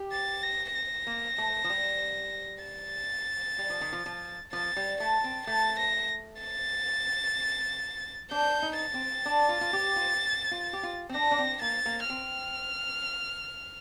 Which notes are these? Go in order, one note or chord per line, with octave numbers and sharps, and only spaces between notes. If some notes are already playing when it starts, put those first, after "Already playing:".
Already playing: G4
A6
A#6
A#6
A#3
A3
F3
G3
A6
G3
F3
D#3
F3
F3
F3 A6
G3
A3 A6
C4
A3 A6
A#6
A6
D4 G6
D#4
A6
C4
D4
F4
F4
G4
F4
F4
G4
F4
C4
D4 A#6
D4
C4
A#3 A6
A#3
C4 F6